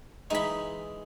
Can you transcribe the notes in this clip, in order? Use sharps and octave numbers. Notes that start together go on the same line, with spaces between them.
E3 G#3 D#4 B5